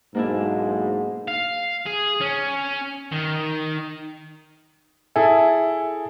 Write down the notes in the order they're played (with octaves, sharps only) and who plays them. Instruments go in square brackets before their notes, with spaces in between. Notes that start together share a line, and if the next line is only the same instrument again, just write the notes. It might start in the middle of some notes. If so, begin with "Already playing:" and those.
[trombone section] B1 G#2 [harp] A#3 D4 E4
[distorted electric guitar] F5
G#4
C#4
D#3
[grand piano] E4 G#4 A4 [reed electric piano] E5 G#5